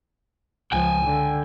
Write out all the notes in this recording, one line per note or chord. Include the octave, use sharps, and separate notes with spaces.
C#2 F3 G5 G#5
D3